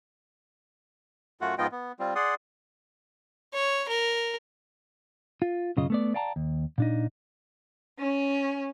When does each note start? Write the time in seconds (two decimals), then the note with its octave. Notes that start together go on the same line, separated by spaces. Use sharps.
1.41 F#2 A3 F4 F#4 F#5
1.58 G#2 F3 B3 F4 D#5 G5
1.72 B3
1.99 G3 C4 F4
2.15 G#4 D5 F#5 C6 D#6
3.54 C#5
3.89 A#4
5.42 F4
5.77 B1 F#2 C#3 F4 D#5
5.90 A3 B3 D5
6.14 D5 F5 G5 A5 A#5
6.36 D#2
6.78 A#2 D4 D#4
7.99 C#4